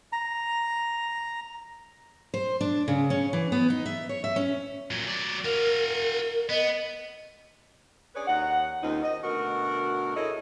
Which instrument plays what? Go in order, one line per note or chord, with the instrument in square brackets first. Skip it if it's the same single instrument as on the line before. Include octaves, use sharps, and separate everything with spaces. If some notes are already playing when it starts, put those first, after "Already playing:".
[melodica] A#5
[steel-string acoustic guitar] C5
D4
C#3
C#4
E3
B3
D#4
E5
C#5
E5
C#4
[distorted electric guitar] A#2 F#3
F#3 D5
[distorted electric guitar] F#4 F5 [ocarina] A#4
[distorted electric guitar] B3 [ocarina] D#5
[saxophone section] C#4 D4 G#4 B4 C#5 D5
D#2 C#4 D#4 F#5
D#2 D#3 C4 C#4 D#4 F4
D#5
D2 B2 F#4 A#4
E4 G#4 A4 C#5 D#5